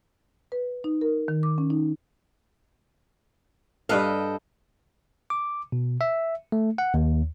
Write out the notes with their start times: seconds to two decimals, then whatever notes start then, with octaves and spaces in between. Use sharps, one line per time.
0.52 B4
0.84 D#4
1.01 A#4
1.28 D#3
1.43 D6
1.58 C#4
1.70 D#4
3.89 G2 A4 B4 D#5 F5 G5
5.30 D6
5.72 B2
6.01 E5
6.52 A3
6.78 F#5
6.94 D#2